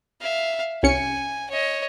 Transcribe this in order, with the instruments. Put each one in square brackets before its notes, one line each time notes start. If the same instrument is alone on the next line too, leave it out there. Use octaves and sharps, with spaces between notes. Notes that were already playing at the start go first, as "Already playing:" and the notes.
[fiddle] E5 F5
[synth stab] C2 C#4 C#7 [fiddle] G#5
[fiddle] C#5 D#5